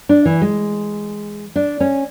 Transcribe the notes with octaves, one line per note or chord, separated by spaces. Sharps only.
D4
E3
G#3
D4
C#4